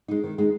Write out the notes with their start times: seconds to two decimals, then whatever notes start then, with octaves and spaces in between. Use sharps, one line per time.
0.08 G#3 D#4
0.24 D#3
0.38 G#3 D#4